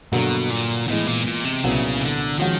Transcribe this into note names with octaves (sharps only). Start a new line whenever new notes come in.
G2 B2 D3 F#3 A#3
A#2
A2 E3 G#3 B3
A#2
A#2
C3
C2 A#2 C#3 F#3 B3 E4
D3
D#3 F3 G#3 C#4 F#4